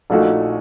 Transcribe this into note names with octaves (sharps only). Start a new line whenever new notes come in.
A#1 A#2 A3 D#4 F#4